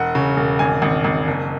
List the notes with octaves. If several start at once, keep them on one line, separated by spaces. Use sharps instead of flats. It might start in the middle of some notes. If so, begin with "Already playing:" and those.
Already playing: E1 F#5
C#3
E1
G#1 G#5
G#1
G#1
F#1